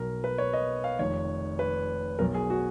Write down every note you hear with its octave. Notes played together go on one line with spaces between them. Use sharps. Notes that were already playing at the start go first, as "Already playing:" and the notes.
Already playing: B1 B2 A#4
B4
C#5
D#5
F5
F1 F2 D#3 C#5
B4
B1 B2 A#4
G#4
F#4